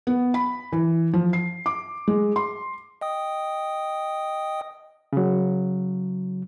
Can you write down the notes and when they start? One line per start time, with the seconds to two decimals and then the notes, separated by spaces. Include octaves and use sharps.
0.07 B3
0.34 B5
0.72 E3
1.13 F3
1.33 C7
1.66 D6
2.08 G#3
2.36 C6
3.01 D#5 G5 D#6
5.13 C#3 F#3